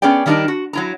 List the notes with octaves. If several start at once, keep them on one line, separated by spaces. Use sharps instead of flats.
B3 C#4 G#4 D5 G5
D#3 G3 D4 D#4 A#4
F#4
F#3 E4 A#5